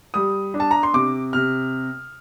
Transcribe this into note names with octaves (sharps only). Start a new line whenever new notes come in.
G3 D#6
D4
A5
A#5
C6
C3 D6
C3 F6